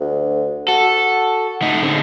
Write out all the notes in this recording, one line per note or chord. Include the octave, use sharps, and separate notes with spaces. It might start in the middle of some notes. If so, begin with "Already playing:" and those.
D2
F#4 A4
A3 D#4
D3 C4